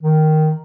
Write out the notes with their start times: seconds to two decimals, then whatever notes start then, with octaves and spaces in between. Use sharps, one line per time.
0.02 D#3